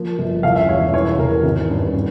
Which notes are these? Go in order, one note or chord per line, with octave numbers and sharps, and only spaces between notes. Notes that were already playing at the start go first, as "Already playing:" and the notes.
Already playing: F3 A#3
G1
E2 F5
E5
E1 C#5
E3 C#5
E2 A#4
G#1
G2
C#4